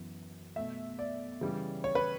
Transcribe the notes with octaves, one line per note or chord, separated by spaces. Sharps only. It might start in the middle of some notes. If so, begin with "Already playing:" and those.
Already playing: F#2 E3 B3
B2 A3 E5
D5
C#3 E3 G3
C#5
B4